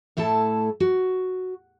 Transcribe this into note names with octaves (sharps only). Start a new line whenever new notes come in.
A2 A3 E4 A4 A5
F#4